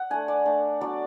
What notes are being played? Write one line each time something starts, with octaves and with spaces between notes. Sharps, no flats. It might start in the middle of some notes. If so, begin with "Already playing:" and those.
Already playing: F#5
A3 D4 G#5
D5
A3 D4
F#3 B3 D4 D5